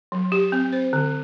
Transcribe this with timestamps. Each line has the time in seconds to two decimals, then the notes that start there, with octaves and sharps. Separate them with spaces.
0.12 F#3
0.32 G4
0.52 C4
0.72 C5
0.93 D3